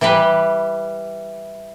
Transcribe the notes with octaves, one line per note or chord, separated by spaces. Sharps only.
E3 G3 G4 B4